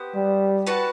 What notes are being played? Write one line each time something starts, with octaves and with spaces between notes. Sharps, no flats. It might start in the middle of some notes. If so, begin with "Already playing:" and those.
Already playing: B3 G4 C5
G3
F#4 B4 F#5 A5